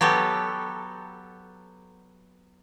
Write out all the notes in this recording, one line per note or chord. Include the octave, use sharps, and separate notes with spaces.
F#3 B3 G4 A4